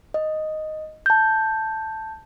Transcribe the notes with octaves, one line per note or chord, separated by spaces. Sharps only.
D#5
A5 G6